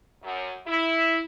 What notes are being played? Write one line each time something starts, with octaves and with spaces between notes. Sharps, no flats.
F#2
E4